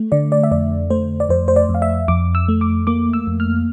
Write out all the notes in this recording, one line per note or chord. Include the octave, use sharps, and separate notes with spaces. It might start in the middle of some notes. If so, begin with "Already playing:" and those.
Already playing: A3
D3 D5
D5
E5
F2 D5
A3 C5
D5
F2 C5
C5
D5
F2
F5
E5
F2 D6
E6
A3
D6
A#3 D6
E6
F2
F6